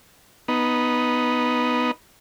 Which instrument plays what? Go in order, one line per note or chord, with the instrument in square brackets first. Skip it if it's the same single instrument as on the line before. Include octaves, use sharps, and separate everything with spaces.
[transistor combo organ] B3 D#4